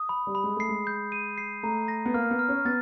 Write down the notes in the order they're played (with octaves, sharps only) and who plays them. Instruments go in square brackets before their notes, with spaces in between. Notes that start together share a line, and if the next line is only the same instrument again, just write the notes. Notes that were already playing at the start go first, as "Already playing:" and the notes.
Already playing: [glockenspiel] D#6
B5
[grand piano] G3
[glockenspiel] B5
[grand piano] G#3
[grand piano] A3 [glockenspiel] C7
[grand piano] G#3
[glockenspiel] G6
D#7
C7
[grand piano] A3 [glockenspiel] A#5
[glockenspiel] A#6
[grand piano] B3
[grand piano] A#3 [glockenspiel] F6
[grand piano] B3
[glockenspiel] F6
[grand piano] C#4
[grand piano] B3 [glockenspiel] A6